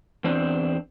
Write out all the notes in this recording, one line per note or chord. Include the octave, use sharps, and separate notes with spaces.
E2 C4 D4